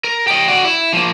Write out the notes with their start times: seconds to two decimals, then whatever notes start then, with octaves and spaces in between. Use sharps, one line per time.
0.04 A#4
0.27 G4 D#5
0.48 F#4 D5
0.65 E4
0.93 F3 A#3